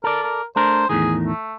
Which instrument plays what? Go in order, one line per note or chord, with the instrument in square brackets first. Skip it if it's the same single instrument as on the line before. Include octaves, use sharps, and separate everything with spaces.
[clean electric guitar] A4 D5 [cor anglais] A#4
[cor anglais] A#4
[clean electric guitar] A3 D4 A#4 [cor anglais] C5
[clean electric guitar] E2 A2 D#3 [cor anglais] G#4
[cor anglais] A3